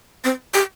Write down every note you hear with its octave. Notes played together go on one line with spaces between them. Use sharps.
C4
G4